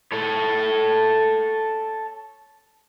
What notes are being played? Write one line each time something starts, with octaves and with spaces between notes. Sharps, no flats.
A4 C#5